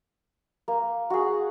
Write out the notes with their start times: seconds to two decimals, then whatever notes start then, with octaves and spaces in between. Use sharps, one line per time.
0.68 A#3
1.10 F#4 G#4